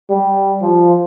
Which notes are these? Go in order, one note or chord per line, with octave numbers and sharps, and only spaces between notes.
G3
F3